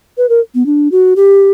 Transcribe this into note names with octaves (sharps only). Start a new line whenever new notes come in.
B4
A#4
B3
D4
F#4
G4